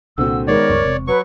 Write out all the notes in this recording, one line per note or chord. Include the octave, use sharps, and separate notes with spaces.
C2 A#2 D3 C4 F#4 E6
D#3 G#3 B3 A#4 C#5 D5
C#2 G2 C#6
E1 C3
F#3 B4 C#6